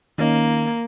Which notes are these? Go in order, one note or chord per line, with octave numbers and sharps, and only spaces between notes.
D#3 A#3 C#4 D#4